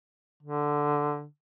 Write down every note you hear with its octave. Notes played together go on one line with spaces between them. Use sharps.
D3